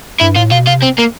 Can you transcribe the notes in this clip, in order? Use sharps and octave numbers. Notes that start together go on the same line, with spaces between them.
G2 E4
A2 F4
B2 F4
C3 F4
C4
A#3